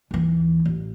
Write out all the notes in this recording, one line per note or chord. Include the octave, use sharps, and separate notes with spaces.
D#2 E3
A1